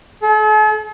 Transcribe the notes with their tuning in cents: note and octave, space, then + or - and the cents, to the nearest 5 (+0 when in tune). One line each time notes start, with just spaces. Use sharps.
A4 -45